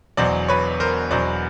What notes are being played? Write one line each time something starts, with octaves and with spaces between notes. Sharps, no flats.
E1 E2 B2 F#3 C5 D5
B4 C#5
A#4 C5
E1 E2 B2 F#3 C5 D5